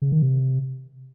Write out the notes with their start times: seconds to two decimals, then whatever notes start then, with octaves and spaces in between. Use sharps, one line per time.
0.02 C#3
0.12 D#3
0.22 C3